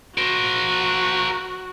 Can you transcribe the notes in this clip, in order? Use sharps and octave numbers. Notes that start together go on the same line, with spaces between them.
F#4 A#4 C5